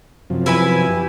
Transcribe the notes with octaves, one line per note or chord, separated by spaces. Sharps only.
F#2 C3 F3
E4 B4 G#5
G4